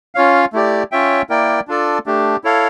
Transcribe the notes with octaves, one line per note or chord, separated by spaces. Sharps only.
C#4 F4 C#5 F5
A3 E4 G4 D5
C#4 F4 C#5 E5 G5
A#3 E4 A#4 D5 G5
D4 F4 A4 D5
A3 D4 G4
E4 A4 C#5 F5